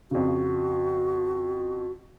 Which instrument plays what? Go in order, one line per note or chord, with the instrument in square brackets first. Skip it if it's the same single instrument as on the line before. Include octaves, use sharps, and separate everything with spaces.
[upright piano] F2 C#3 [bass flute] F#4